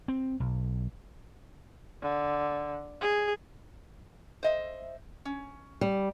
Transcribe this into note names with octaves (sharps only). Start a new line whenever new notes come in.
C4
B1
D3
G#4
C5 D#5 E5
C#4
G3